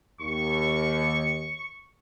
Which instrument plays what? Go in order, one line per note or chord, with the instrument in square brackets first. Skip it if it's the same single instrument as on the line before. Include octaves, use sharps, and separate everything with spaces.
[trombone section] D#2 [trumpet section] C#6